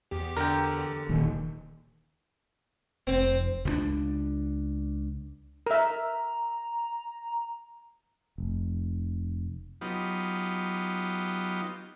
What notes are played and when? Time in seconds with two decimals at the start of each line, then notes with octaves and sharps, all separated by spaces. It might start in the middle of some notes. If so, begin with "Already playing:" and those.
0.11 E2 G4
0.37 D3 A#4 G5
1.09 D#1 D#2
3.07 F1 C4
3.65 C#2 G3 D4
5.66 A#4 E5 A#5
8.38 F1
9.81 F#3 B3 D#4 F4 G4